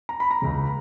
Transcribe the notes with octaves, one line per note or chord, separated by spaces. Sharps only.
A#5
B5
A#5
C#2 C#3